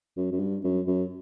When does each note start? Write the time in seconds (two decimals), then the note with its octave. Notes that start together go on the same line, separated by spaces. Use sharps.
0.17 F#2
0.31 F#2
0.40 G2
0.64 F#2
0.87 F#2